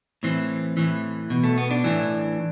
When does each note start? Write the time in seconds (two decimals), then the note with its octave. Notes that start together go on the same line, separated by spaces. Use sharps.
0.23 A2 E3 C4
0.77 A2 E3
1.30 B2
1.44 A3
1.58 B3
1.71 D4
1.84 A2 E3